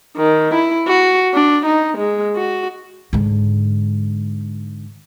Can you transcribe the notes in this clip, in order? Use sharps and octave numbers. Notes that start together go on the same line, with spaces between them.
D#3
E4
F#4
D4
D#4
G#3
F#4
G#2 D3